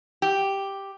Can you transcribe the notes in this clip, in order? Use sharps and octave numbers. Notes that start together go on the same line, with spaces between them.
G4